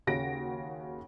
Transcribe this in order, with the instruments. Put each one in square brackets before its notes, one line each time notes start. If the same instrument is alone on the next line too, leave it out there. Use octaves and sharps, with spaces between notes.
[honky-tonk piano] D#2 C#3 F#4 A#6 D7